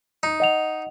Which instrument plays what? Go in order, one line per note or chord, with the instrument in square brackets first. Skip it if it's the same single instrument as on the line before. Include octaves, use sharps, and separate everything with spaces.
[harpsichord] D#4
[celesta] D#5 F#5 F7